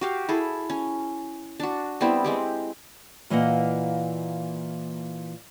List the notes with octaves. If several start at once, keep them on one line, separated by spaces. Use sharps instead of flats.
F#4 G4 F5
E4 G#4 A4
C#4
D4 F#4
G3 B3 C4 E4
G#3 C4 G4
A#2 E3 A#3 D#5 F#5